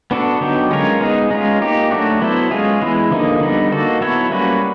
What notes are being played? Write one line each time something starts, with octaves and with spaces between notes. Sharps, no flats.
B3 D4 F#4 A4
D3 F#3 B3 D#4 G4
G#3 C#4 F4 A#4 C#5
G#3 B3 D#4 G#4
G#3 C#4 F4
A#3 D#4 G4
F#3 A3 D4 F#4
F#3 B3 E4 A4 C5
G#3 C#4 F4 G#4
E3 G#3 B3 E4
D3 F3 A#3 D#4 G#4
D3 G3 B3 D#4
A#3 D#4 F#4 A4
F#3 B3 E4 A4 C#5
G3 A#3 C#4 F#4 B4